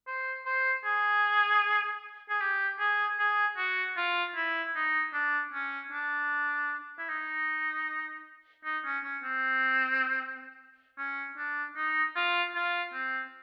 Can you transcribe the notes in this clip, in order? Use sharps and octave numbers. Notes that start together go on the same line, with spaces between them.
C5
C5
G#4
G#4
G4
G#4
G#4
F#4
F4
E4
D#4
D4
C#4
D4
E4
D#4
D#4
C#4
C#4
C4
C#4
D4
D#4
F4
F4
C4